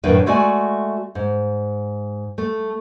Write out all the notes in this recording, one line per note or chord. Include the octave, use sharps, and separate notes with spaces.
F#2 A2 D#3 D4 B4 E5
G#3 A3 F#4 D5 G#5
G#2
A3